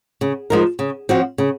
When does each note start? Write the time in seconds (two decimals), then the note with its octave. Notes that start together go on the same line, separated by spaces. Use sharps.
0.21 C#3
0.50 F3 G#3 D#4 A#4
0.79 C#3
1.09 F3 C4 F#4
1.38 C#3